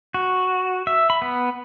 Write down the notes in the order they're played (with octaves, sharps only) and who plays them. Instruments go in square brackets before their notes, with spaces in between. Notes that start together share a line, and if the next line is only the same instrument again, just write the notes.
[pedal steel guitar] F#4
E5
B5
B3